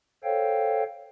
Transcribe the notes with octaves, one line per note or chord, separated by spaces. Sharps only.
A4 C5 C#5 F5 G5